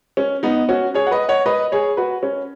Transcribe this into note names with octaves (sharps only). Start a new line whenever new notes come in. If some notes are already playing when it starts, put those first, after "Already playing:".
C#4
B3 D#4
C#4 F#4
G#4 C#5
F#5
B4 D#5
C#5 F#5
B4 D#5
G#4 C#5
F#4 B4
C#4